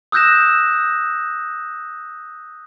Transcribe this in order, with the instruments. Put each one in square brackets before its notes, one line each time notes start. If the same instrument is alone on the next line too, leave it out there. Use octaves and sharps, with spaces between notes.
[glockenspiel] D#6 E6 F#6 G6 A#6 E7